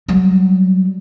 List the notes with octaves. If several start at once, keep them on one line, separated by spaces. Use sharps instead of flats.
F#3 G3